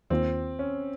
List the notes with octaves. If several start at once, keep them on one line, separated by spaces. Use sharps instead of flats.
D#2 D#3 A#3 C4 F4
C#4